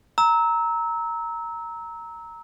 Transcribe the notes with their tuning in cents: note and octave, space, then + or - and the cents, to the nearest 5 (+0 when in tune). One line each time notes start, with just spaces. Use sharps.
A#5 -5 E6 -25